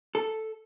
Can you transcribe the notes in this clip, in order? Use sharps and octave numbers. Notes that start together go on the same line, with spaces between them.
A4